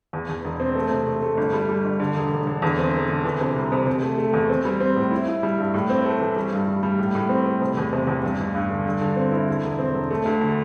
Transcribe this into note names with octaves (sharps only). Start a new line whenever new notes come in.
E2
E2
E1
C4
A3
C3
A3
A3
G1
G3
G3
G1
D3
E1
E1
D3
E2
C4
E1
D3
E3
C3
C2
C3
C3
A3
A3
E2
C4
G3
C4
A2
E4
E4
G3
G2
A2
C4
A3
E3
G3
G2
G3
G3
A2
A2
C4
A2
C3
E2
C3
E2
G2
A1
G2
D3
G2
D3
C4
E4
D3
E1
C4
E1
A3
D2
D3